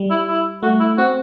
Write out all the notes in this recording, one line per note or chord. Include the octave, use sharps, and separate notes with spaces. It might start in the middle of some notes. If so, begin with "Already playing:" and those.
Already playing: G3
E4
E4
A3 F#4
E4
C4 F#4